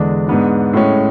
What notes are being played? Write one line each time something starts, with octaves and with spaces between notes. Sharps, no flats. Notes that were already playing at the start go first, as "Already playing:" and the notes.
Already playing: E2 D3 G#3 D4
G#2 G#3 B3 D4
A2 G#3 C#4